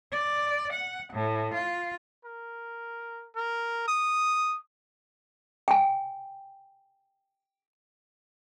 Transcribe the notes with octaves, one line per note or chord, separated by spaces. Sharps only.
D5
F#5
A2
F4
A#4
A#4
D#6
G5 G#5